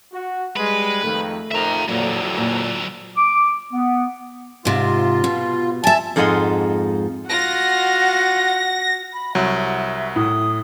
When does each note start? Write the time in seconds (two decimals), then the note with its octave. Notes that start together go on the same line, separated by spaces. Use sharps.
0.13 F#4
0.57 G3 G#3 B4
1.03 F2 D#3 A3
1.52 F2 D#3 E5 A#5
1.89 A1 F2 A#2 D3 F#3
2.37 A#2
3.16 D6
3.72 B3
4.65 G#2 C3 F4
5.24 B2
5.84 E5 G#5 A5
6.16 F2 G#2 F4 D#5 F#5 C6
7.30 F4 F#4 F#5 A#6
9.13 B5
9.35 C2 F#3 E5
10.16 A2 D#6